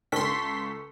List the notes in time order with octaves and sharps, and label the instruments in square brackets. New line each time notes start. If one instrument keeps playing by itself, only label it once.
[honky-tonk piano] C#2 A4 C#6 [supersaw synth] C6 B6